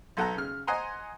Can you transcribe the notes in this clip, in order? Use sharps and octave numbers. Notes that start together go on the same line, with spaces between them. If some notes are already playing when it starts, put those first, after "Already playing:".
B1 A4 F#5 A#5
C#3 F6
C5 D#5 F#5 G#5 A#5 C6